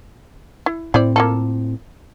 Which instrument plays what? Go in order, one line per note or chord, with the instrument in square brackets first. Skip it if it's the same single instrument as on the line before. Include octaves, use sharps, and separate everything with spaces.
[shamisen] E4
[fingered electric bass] A2 C4 [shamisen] E4 C5 D5
[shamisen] A#3 F4 A4